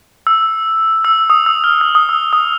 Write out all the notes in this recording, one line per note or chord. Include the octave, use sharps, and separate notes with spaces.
E6
E6
D#6
E6
F6
E6
D#6
E6
D#6